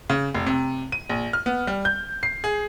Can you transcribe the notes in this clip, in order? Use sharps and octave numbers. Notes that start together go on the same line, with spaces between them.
C#3
F1
C3
D#7
A#1
F6
B3
G3
G6
C7
G#4